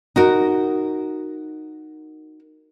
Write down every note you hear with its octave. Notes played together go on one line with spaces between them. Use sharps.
D#4 F#4 A#4